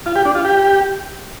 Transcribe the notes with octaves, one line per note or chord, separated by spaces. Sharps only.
F4
G4
D4
F4
G4